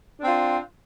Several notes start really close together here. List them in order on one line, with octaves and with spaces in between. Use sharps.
D4 C4 F4